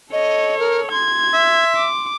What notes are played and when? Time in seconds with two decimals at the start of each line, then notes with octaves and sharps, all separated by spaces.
0.12 A4 C#5 D#5
0.59 A#4
0.92 C6 G#6
1.34 E5
1.77 D6